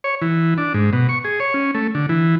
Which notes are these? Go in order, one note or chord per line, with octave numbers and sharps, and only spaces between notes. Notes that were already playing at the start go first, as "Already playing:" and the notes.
C#5
E3
D4
G#2
B2
C#6
G#4
C#5
C#4
A3
D3
E3